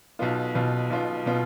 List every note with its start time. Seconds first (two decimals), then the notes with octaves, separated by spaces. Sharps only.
0.19 B1 B2 B3 F4
0.55 B1 B2 B3 F4
0.90 B1 B2 B3 F4
1.26 B2 B3 F4